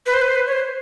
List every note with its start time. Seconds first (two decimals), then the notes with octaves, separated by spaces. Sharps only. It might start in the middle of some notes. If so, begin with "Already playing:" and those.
0.06 B4
0.14 C5
0.21 B4
0.28 C5
0.35 B4
0.47 C#5
0.52 C5